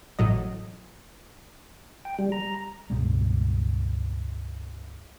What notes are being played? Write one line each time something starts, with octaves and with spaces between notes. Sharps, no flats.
A1 A2 F#3 D#5
G5
G3
A#5
C#2 G2 B2 G#3